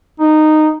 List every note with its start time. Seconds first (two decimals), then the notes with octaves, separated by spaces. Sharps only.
0.20 D#4